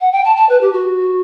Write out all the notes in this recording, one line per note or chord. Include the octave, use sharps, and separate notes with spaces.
F#5
G5
A5
A5
B4
G4
F#4